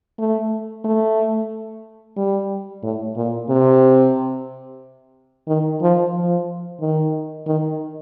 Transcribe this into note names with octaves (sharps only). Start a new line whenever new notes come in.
A3
A3
G3
A2
A#2
C3
D#3
F3
F3
D#3
D#3